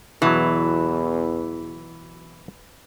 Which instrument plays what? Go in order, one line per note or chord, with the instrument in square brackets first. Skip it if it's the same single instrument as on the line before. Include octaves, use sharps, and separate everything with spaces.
[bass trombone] E2 [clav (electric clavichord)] B2 F#3 [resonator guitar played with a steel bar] E3